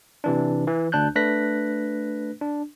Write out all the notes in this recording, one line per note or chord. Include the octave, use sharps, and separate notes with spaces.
C3 E3 D4
E3
D2 D4 A5 F#6 G6
A3 D4 B4 F#6 A#6 B6
D4